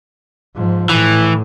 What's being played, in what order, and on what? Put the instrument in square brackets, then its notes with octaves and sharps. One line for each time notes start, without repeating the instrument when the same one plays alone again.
[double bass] G#2 F3
[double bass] A2 [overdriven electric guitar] E3